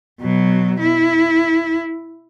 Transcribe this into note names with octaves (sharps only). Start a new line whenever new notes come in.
B2 F#3
E4